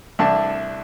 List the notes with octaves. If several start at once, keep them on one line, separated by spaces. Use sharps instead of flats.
C2 A3 D4 A5